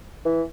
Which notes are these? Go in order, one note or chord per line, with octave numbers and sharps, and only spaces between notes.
E3